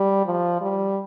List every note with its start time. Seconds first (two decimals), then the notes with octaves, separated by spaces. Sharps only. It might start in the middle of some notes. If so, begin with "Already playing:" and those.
Already playing: G3
0.26 F3
0.61 G3